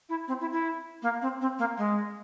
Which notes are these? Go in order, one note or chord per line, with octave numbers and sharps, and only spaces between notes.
E4
C4
E4
E4
A#3
C4
C4
A#3
G#3